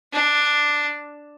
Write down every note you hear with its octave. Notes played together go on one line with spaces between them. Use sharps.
D4